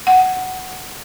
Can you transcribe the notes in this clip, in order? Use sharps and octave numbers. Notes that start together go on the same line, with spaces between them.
F#5